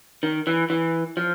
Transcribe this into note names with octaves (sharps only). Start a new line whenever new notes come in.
D#3
E3
E3
F3